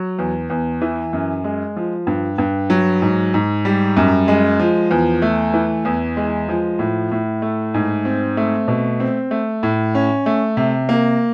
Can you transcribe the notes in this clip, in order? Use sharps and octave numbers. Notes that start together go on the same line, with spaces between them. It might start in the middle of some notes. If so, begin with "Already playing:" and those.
Already playing: F#3
E2
E2
E3
F#2
G#3
F3
G2
G2
F#3
G#2
G#2
G3
F#2
G#3
F3
E2
A3
E3
E2
G#3
F3
A2
A2
A3
G#2
C4
A3
B2
C4
A3
A2
C#4
A3
C3
A#3